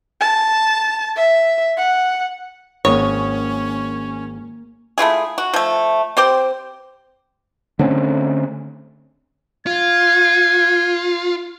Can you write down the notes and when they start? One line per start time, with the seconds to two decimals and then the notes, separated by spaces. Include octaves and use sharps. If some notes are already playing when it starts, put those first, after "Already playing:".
0.21 A5
1.16 E5
1.77 F#5
2.85 G#1 A#3 C#4 C#5 D#6
4.98 A3 E4 F4 G#4
5.38 F#4
5.54 F3 A3
6.17 C4 G4 C5
7.79 D3 A3 C4 C#4
9.67 F4 G#6